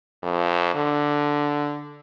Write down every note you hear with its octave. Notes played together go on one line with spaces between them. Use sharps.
F2
D3